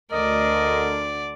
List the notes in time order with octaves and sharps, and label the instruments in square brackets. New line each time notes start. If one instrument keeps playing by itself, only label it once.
[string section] D2 D3 [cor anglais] A#4 [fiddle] D5 [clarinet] D#5